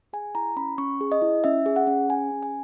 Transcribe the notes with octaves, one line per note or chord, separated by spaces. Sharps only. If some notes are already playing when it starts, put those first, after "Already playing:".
G#4 G#5
E4 A#5
C#4 B5
C#4 C#6
G#4
D#5
E4
C#4 E5
G#4
F#5
C#4
G#4 G#5
C#4
G#5